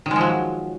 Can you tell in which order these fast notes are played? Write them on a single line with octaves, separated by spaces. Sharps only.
D#3 G#3 F3 F#3